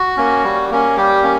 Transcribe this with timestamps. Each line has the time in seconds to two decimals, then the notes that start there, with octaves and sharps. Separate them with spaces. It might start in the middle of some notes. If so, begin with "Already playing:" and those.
Already playing: F#4
0.17 A#3 C#4
0.44 G3
0.71 A#3 C#4
0.97 G3 G4
1.23 A#3 C#4